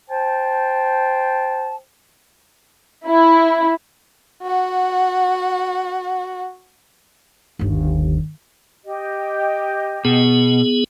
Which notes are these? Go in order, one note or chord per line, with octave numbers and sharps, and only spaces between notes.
C5 G5 A5
E4
F#4 F#5
G1 D#2
G4 D#5
B2 B3 G#4